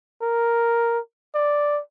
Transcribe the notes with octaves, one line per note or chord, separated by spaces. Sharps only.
A#4
D5